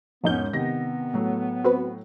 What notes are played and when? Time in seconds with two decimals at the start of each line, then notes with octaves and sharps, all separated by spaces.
0.23 E1 F2 G#2 B3 C#4 D#4 G6
0.53 C3 D#3 B3 A#6
1.13 A2 F#3 A3
1.64 C4 F#4 B4